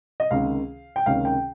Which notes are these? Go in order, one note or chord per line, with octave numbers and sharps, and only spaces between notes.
D#5
C#2 C3 D#3 A#3 C#4 F5
G5
C#2 C3 D#3 A#3 C#4 F5
G5